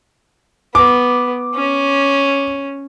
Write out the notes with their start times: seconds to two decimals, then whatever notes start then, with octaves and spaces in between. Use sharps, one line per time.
0.75 B3 D6
1.55 C#4